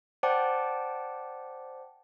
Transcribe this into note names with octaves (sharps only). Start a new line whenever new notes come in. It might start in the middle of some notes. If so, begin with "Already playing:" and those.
C5 D5 F#5 G5 A5 D6